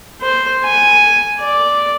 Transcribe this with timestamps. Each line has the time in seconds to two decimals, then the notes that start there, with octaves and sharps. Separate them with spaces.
0.21 C5
0.64 G#5
1.40 D5